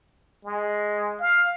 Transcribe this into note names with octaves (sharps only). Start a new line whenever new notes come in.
G#3
F5